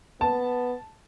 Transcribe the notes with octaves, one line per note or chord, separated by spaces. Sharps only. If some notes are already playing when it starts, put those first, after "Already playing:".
B3 A5